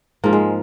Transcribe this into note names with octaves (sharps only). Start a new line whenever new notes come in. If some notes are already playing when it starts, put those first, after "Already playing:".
G#2 F3 A#3
G#3